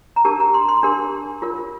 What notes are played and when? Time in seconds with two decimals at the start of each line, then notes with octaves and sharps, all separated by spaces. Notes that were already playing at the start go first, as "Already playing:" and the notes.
0.16 A#5
0.25 D4 G4 A#4 A5
0.40 A#5
0.54 C6
0.69 C6
0.83 D4 G4 A#4
1.42 F4 A#4